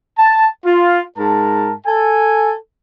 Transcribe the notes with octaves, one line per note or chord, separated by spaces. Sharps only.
A5
F4
G#2 A#4 A5
A4 G#5